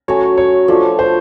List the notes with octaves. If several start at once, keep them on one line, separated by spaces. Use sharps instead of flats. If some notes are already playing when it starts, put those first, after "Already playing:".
F#3 A3 C#4 F#4 C#5
C#5
F3 A3 D4
C5